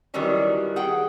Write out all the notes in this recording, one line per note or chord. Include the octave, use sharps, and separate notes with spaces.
D#3 E3 F#3 G3 C#4
G#4 F#5 G5